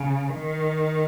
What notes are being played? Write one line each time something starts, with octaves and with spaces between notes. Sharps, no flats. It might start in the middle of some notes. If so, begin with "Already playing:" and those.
Already playing: C#3
D#3